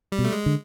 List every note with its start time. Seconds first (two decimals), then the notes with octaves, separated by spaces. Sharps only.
0.12 G3
0.19 B2
0.24 A3
0.32 G#3
0.46 D3